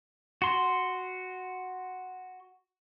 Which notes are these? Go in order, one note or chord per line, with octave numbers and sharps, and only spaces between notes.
F#4 C6